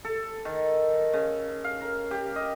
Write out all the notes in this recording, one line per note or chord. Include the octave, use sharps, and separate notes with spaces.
A4
D#3
C#3
F5
A#4
G4
D#5